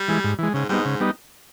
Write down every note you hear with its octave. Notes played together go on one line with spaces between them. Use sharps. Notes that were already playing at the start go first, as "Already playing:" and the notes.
Already playing: G3
E3 G#3
G#2
E3 G#3
G#2 C#3
G#2 G3 B3 D#4
C#3
G3 B3 D#4